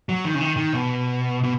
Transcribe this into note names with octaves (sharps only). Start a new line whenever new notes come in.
F#3
D#3
C#3
D#3
D#3
B2
B2